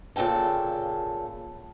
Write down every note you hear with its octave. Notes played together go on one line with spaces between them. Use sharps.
A#2 C#3 A4 G5 A5